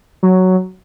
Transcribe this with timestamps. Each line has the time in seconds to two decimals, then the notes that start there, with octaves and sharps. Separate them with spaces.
0.23 F#3